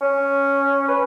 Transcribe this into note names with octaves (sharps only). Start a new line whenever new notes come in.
C#4
B4